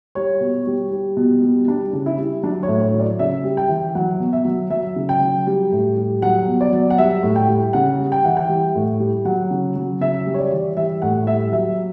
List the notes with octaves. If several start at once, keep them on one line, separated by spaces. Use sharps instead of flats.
G3 C#5
B2
G3
G3
B2
G3
G3 D4
C#3
E4
G3
F#3 D4
C#5
A2
C#5
F#3
D5
C#3 E5
G3
G5
E3
F#3 F#5
B2
E5
F#3
F#3 E5
C#3
G5
F#3
G3
A2
G3
F#3 F#5
B2
D5
F#3
F#5
G3 E5
A2
G5
G3
C#3 F#5
G3
G5
E3 F#5
G5
G3
A2
G3
F#3 F#5
C#3
F#3
C#3 E5
G3
C#5
D5
E3
G3 E5
A2 F#5
G3 E5
F#3 E5